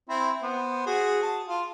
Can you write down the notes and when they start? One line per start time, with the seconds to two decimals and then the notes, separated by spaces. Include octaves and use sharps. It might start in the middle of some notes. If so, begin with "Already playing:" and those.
0.09 C4 E4
0.42 B3 C5
0.86 F#4 G#4
1.23 A5
1.47 F4